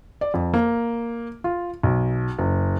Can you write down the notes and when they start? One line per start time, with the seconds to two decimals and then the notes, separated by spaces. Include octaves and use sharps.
0.21 D5
0.34 F2
0.54 A#3
1.44 F4
1.83 B1
2.39 F#1